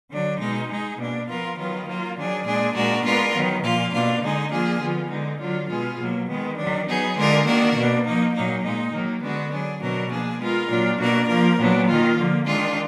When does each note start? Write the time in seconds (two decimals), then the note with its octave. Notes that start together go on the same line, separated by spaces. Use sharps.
0.11 D3 F#3 D4
0.40 B2 G#3 D#4
0.69 G#3 D#4 G#4
0.99 B2 A#3 D4
1.28 F3 B3 F4 A#4
1.57 D#3 F#3 B3 F4
1.87 F#3 A#3 F4
2.16 D#3 F#3 D4 G#4
2.45 A#2 G#3 D4 G#4
2.75 A#2 G#3 D4 F#4 A#4
3.04 G#3 B3 D4 F4 A#4
3.34 D#3 F#3 B3
3.63 A#2 F3 A#3 F4
3.93 B2 A#3 D4 F4
4.22 D3 G#3 D#4 G#4
4.51 F3 A#3 D4 F4 G#4
4.80 D3 F3 B3 F4
5.10 D3 G#3 D#4
5.40 D3 F#3 D4 F4
5.69 B2 G#3 B3 F4 G#4
5.99 B2 F#3 A#3
6.28 D#3 G#3 B3
6.57 D#3 F#3 D4
6.87 F#3 B3 D#4 G#4
7.17 D3 G#3 D4 F4 A#4
7.46 D#3 A#3 D4 F#4 A#4
7.75 B2 A#3 D4
8.05 F3 A#3 D#4
8.34 A#2 F#3 A#3 D#4
8.63 A#2 G#3 D#4
8.93 D#3 F#3 A#3
9.22 D3 G#3 B3 D4 F#4
9.52 F#3 D4 G#4
9.81 B2 F#3 D4 F#4 A#4
10.11 F3 A#3 D4 G#4
10.40 G#3 B3 F4 A#4
10.70 A#2 F#3 D4 F4
10.99 B2 A#3 D4 F#4 A#4
11.28 F3 A#3 F4 A#4
11.58 A#2 F#3 B3 D4
11.87 D#3 A#3 F4
12.17 D3 F3 A#3
12.46 D#3 G#3 D4 F4